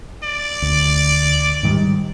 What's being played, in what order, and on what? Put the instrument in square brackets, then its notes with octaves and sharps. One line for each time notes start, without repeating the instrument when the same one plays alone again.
[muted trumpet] D5
[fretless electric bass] D2
G#2 D#3 G3